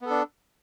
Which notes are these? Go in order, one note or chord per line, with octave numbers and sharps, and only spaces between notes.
B3 D4 A4